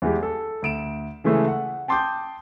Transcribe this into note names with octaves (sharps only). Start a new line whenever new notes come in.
E2 E3 G#3 G4
A4
D2 D7 E7
C#3 E3 G#3 A3 G#4 A4
F#5
G5 A5 C6 D6 D#6 G6